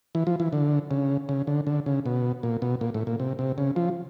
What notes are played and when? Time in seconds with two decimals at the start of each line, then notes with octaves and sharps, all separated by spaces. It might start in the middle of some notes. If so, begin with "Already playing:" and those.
0.15 E3
0.27 F3
0.40 E3
0.53 D3
0.91 C#3
1.29 C#3
1.47 D3
1.67 D3
1.86 C#3
2.06 B2
2.43 A#2
2.62 B2
2.81 A#2
2.94 A2
3.07 A#2
3.20 C3
3.39 C3
3.58 C#3
3.76 F3